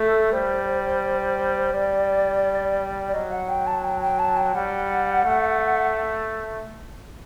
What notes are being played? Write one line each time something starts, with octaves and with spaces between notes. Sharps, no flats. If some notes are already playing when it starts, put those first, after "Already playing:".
Already playing: A3 A4
G3 C5
G3 D5
D5
F#3 D#5
F#5
G5
A5
G5
G5
A5
G5
G3 F#5
A3